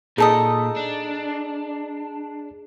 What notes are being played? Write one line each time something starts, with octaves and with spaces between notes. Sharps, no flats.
A#2 D#4 G#4 A4 D#5
D4